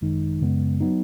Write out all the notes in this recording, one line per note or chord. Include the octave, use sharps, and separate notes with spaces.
G#1 F#2 D#3 G#3 D#4
F#2 C#3 G#3 B3
F#3 B3 D#4